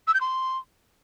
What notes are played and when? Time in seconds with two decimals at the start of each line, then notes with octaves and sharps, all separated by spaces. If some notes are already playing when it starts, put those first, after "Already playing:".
0.07 E6
0.14 G6
0.21 C6